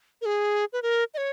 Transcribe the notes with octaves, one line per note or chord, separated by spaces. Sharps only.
A#4
G#4
B4
A#4
D#5
C#5